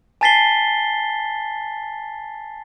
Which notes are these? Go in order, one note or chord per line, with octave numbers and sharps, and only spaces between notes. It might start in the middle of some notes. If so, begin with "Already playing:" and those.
G#5 A5 A6 B6 C7 G7